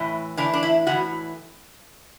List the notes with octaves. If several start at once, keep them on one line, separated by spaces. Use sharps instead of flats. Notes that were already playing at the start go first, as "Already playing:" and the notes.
Already playing: A2 E3
A2 E3 D4
D4
E4
A2 E3 F#4